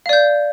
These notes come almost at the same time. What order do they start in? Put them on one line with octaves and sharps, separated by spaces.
F5 D5 G6